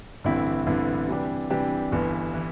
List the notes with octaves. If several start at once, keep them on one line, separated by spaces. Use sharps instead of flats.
A1 G2 D3 C4 E4
A1 G2 D3 C4 E4
C3 E3 G3 D4 G4
C3 E3 G3 D4 G4
G1 G2 E3
E3